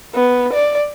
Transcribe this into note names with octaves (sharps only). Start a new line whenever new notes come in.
B3
D5